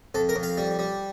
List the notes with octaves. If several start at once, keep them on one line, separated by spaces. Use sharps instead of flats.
F2 A4
A#4
F2
F5
G3
G3